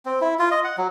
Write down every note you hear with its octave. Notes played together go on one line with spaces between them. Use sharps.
C4
E4
F4
D#5
F#5
F#3